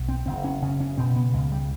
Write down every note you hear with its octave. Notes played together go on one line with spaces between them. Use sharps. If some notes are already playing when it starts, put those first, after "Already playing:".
Already playing: B1
C4
F#1 C4
C#4
C#3 C#4
C#4
B2 C4
B3
C#2 G#3
G3